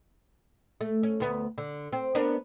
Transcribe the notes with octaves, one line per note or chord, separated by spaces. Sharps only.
A3
C#4
D2 B3
D3
C4
B3 D4 A#4